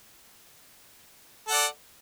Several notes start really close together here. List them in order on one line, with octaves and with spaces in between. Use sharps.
A4 F#5 D5